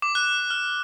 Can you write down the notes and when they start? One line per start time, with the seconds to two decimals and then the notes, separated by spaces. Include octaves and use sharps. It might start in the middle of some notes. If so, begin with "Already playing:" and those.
0.02 D6
0.15 F#6
0.50 F6